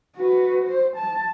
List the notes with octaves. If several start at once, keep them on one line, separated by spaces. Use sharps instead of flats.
F#4 B4
C5
A5